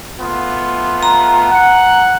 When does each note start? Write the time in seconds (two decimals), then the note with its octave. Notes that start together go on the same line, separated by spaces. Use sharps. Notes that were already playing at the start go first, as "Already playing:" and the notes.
0.19 A3 B3 F4
1.03 A#5
1.50 F#5